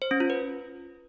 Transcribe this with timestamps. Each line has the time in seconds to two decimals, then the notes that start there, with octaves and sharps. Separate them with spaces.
0.02 C5
0.11 C#4
0.20 F4
0.30 B4